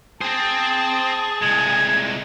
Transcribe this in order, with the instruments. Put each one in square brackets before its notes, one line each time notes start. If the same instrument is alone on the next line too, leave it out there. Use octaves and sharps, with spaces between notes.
[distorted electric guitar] C4 C5 [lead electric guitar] G#4 [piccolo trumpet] A5
[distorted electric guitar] C2 G#3 [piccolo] G#6